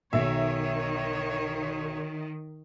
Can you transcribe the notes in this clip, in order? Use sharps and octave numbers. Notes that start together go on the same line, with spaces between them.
B1 D#3 C#5 E5